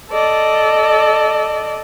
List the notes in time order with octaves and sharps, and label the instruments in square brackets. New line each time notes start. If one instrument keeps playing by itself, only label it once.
[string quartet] A4 D5 D#5